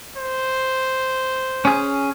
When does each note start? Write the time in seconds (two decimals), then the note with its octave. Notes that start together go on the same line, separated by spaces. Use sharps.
0.17 C5
1.65 C#4 G#4